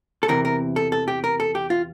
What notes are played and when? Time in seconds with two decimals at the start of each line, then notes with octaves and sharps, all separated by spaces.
0.23 A4
0.28 E2 C3 E3 A#4
0.45 A#4
0.76 A4
0.92 A4
1.08 G4
1.24 A#4
1.40 A4
1.55 G4
1.70 F4